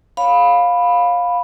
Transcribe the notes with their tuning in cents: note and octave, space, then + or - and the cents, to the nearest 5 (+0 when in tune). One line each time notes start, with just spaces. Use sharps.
C#5 +0 F5 +15 B5 +0